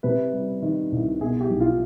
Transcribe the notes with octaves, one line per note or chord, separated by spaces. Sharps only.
C3 B4
G3
D#3
C2
B2 G#4
G4
B1
F4